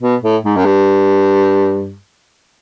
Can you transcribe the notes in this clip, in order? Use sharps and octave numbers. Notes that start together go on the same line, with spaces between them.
B2
A2
G#2
F#2
G2